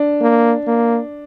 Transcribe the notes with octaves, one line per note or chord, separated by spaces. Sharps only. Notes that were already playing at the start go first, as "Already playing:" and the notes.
Already playing: D4
A#3
A#3